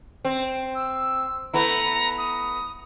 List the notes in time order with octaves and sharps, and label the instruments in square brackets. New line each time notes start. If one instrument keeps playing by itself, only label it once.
[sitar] C4
[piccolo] E6
[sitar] A3 B3 E4 [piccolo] A#5
[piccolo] D#6